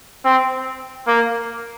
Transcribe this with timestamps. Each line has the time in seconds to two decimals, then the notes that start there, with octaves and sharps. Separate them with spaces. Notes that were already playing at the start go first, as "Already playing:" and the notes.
0.24 C4
1.07 A#3